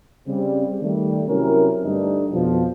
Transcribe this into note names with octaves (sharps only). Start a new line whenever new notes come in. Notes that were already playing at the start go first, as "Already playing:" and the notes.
C#3 G3 C4
D#3 G3 A3
C3 F#3 C#4 E4 A#4
G2 D3 G3 A3 D4 D#4
F2 B2 F3